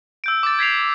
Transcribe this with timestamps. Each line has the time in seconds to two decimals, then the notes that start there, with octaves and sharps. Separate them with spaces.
0.24 E6 G6 D7
0.43 D6 A6
0.59 G#6 B6 C7 F7